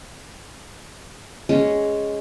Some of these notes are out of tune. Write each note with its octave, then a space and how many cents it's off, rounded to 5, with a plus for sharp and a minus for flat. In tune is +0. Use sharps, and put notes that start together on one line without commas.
G#3 +0 C#4 +0